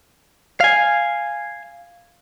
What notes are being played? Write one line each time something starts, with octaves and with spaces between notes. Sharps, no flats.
F5 G#5